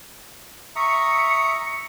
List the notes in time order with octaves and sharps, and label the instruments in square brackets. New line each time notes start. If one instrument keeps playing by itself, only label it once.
[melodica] E5 A#5 D#6 [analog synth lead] C#6 [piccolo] C#7